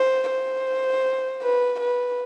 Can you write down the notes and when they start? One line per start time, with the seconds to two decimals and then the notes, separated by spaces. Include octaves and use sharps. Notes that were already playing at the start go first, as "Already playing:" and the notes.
Already playing: C5
0.30 C5
1.42 B4
1.80 B4